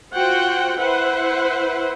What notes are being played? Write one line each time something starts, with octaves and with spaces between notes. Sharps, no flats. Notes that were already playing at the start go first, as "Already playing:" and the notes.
F4 F#4 C5 F#5 G5
E4 B4 C5 F#5